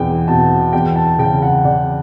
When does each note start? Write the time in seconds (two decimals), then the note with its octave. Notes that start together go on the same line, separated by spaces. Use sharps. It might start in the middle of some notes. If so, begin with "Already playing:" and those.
Already playing: E2 B2 G5
0.28 B2 A5
0.73 E2 G5
0.96 A5
1.19 C#3 G5
1.42 F#5
1.64 C#3 D5